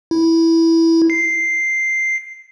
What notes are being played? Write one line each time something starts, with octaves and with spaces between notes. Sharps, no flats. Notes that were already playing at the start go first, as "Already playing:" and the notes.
E4
C7